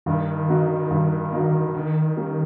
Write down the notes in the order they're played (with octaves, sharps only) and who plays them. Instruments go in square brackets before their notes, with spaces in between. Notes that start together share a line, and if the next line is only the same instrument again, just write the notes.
[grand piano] G2 [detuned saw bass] D#3
[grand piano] D3 F#3 A#3 D#4
G2
D3 F#3 A#3 D#4
[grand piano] D3 [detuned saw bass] D#3
[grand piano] G3 A#3 C#4